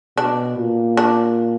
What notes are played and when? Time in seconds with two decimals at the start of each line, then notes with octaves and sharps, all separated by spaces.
0.17 B2 D4
0.57 A#2
0.97 D4